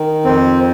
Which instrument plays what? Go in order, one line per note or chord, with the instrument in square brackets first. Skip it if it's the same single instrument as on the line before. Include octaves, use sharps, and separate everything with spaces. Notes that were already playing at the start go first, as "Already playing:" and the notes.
Already playing: [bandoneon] D#3
F2 C4